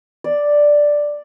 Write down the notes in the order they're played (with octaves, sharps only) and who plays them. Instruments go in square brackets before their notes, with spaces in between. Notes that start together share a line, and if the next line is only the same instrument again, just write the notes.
[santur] D5